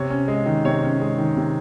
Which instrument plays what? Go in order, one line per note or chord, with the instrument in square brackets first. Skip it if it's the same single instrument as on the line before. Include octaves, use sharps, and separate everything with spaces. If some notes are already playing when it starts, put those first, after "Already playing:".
Already playing: [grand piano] C3 C#5
C#4
G#3
D#3
C3 C#5
C#4
G#3
D#3
C3